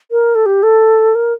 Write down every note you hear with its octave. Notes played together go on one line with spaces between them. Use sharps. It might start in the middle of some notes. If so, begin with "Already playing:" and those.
A#4
A4
G4
A4
A#4